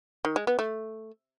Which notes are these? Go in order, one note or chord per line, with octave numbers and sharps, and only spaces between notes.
D#3
G#3
B3
A3